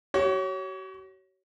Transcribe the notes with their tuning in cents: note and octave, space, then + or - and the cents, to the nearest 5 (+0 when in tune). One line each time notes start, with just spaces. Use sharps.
F#4 +45 C#5 +0